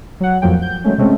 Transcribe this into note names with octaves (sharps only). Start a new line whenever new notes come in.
F#3 F#5
F2 A2 F3 F#3 A#3 G5
G6
D#3 F#3 G#3 A3 C#4
C3 G#3 A3 C4 C#4